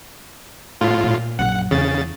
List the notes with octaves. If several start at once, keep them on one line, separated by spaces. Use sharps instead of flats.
A2 F4
A#2
A#1 F#2 F#5
E2 C#3 A6